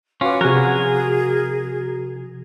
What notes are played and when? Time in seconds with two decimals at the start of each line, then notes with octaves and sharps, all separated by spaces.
0.21 C#4 F4 F#4 B4 D6
0.41 C3 F3 F#4 G#4 A#4 G#5